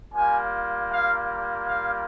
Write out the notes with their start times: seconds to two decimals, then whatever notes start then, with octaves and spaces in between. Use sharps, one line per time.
0.14 G3 A#3 F4 G#5
0.91 F5
1.68 F5